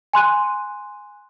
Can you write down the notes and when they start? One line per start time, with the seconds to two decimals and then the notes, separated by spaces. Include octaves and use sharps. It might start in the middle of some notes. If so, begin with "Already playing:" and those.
0.13 G#5 C6 F#6 D#7